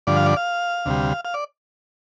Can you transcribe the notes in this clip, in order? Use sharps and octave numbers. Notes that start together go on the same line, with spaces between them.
G2 D3 F3 D5
F5
D5
F5
D2 C3 G3
F5
D5